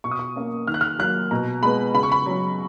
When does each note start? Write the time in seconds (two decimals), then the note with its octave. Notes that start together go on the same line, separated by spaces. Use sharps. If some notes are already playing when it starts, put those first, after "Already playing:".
0.04 B2 C#6
0.11 D#6
0.19 C#6
0.36 A#3 C#4
0.67 D#3 F6
0.74 F#6
0.81 F6
0.99 F#3 A#3 F#6
1.31 B2 A#5
1.62 G#3 B3 B5
1.94 C#3 B5
2.03 C#6
2.12 B5
2.26 F#3 C#4